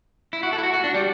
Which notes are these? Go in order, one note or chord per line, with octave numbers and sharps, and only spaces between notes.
E4
F#4
A4
E4
F#4
F#4
D4
G3